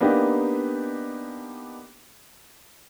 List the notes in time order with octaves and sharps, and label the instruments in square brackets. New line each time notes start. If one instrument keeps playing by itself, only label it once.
[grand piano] A#3 B3 D4 D#4 G4